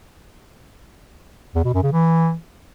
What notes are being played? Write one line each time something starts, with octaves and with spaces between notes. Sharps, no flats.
E2
B2
F#2
C#3
E3